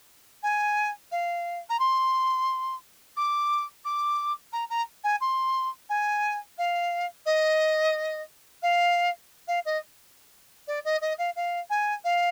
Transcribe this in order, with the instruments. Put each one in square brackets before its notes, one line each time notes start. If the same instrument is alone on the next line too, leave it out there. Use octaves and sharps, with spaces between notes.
[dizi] G#5
F5
A#5
C6
D6
D6
A#5
A#5
G#5
C6
G#5
F5
D#5
F5
F5
D#5
D5
D#5
D#5
F5
F5
G#5
F5